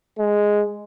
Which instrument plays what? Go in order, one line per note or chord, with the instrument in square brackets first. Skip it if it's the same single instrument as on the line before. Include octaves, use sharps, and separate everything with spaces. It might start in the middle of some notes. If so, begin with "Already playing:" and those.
[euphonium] G#3